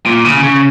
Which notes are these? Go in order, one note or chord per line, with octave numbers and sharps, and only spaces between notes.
A#2
C#3
C#3